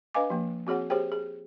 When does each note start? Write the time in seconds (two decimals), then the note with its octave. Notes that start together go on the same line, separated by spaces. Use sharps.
0.14 D4 B4 D#5 F5 G#5 D6
0.30 F3 A#3
0.67 C4 F#4 G#4 C#5 F#5
0.90 G4 G#4 C5 C#5 G5
1.12 G#4